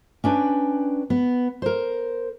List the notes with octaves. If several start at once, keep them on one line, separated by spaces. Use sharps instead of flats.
C#4 D4 B4 G5
B3
A#4 C5